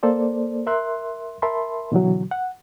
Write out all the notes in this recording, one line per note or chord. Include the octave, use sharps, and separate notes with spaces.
A#3 A4 C5 D5
A#4 E5 C6 F#6
A#4 E5 A5 B5 C6
B2 D3 E3 F#3
F#5